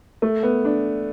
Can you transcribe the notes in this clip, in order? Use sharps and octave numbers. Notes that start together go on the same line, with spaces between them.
A3
B3
D4